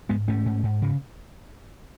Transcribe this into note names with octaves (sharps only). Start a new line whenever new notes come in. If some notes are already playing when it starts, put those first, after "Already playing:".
G#2 G#3 B3
G#2 A3 C#4
G#2
G#2
C#3